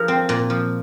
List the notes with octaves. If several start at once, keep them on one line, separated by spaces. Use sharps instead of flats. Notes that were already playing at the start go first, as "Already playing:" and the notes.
Already playing: F3 G#4 A#4
C4
A#2
F3